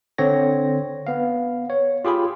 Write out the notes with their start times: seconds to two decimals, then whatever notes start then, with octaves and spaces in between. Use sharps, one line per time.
0.18 D3 C4 C#5 A#6
1.07 B3 F5
1.70 C#5
2.05 F4 G4 G#4 B5